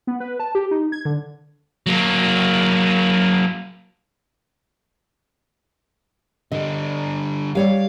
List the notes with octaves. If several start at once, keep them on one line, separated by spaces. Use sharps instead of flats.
B3
B4
A5
G4
D#4
G#6
D3
F#3 A#3
D3 G3 D#5
G3 C#5 D5 F5